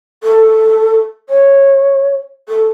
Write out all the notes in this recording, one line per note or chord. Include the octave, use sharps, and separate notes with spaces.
A4
C#5
A4